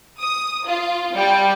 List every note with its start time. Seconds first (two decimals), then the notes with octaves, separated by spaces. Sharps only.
0.20 D#6
0.67 F4
1.15 G3